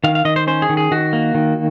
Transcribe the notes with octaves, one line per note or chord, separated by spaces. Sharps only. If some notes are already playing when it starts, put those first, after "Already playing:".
D#3 F5
F5
D#3 D#5
C5
C#4 C5
G#4
D#3
G#4
D#3 F#4
A#3
D#3